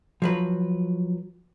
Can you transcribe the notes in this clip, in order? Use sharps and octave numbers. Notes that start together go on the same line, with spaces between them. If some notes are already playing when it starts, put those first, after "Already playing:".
F3 F#3 B4